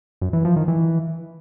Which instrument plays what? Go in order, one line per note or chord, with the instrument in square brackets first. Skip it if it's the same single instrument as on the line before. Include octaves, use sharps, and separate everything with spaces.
[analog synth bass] F#2
E3
F3
D#3
E3